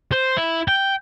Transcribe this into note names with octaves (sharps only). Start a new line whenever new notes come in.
C5
E4
G5